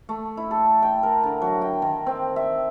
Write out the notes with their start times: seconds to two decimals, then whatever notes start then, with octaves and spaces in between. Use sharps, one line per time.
0.09 A3
0.37 E4
0.51 A4
0.83 G5
1.03 A#4
1.23 D3
1.42 F#3
1.62 G5
1.82 D#3
2.07 C4
2.36 E5